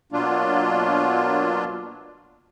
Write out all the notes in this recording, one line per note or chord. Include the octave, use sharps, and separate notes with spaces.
B2 F#3 A#3 D4 F4